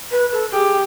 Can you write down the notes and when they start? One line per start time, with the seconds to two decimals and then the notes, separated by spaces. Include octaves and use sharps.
0.11 B4
0.32 A4
0.52 G4 G#4